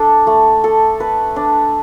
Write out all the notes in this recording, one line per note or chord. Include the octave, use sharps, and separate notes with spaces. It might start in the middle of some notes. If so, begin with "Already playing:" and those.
Already playing: D4 A4
A3
A4
B4
D4